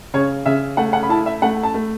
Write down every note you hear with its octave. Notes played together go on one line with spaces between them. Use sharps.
C#3 C#5
C#3 E5
A3 F#5
F#5
B5
E4 A5
E5
A3 F#5
A5
A3